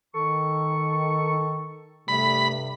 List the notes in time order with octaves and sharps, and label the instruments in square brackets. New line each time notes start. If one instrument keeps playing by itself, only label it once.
[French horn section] D#3 [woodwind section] A4 C#6
[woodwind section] G2 C3 [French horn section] G3 A3 [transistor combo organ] B5